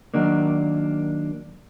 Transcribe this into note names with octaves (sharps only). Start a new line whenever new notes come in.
D#3 F#3 A#3 D4